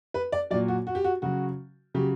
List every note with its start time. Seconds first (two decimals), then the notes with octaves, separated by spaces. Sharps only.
0.14 B4
0.32 D5
0.50 F#3 D5
0.54 A#2
0.68 F#4
0.87 F#4
0.95 G4
1.04 F#4
1.22 C#3 F#3 F#4
1.94 C#3 F#3 G4